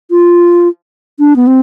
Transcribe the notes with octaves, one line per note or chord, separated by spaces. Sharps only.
F4
D4
B3
C4